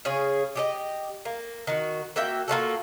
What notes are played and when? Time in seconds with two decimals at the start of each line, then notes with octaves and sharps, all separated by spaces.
0.05 C#3 G#4 C#5
0.56 G4 G#4 D#5
1.25 A#3
1.67 D#3 F#4
2.16 A#3 F#4 E5 G5
2.48 A#3 F4 F#4 A4